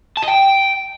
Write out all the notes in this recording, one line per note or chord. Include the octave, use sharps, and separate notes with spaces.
A5
D#5
G5